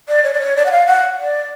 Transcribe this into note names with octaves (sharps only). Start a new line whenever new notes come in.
D5
C#5
D5
C#5
D5
F#5
F5
F#5
D5